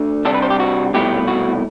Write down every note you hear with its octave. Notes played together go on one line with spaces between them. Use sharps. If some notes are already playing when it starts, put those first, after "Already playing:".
Already playing: D2 D3
C3 G3 D4 A4
B4
C5
G4
F#4
C2 B2 A3 E4 G4
F#4